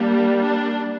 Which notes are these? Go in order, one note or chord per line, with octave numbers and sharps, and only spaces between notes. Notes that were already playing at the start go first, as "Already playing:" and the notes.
Already playing: G3 A#3 D4
D4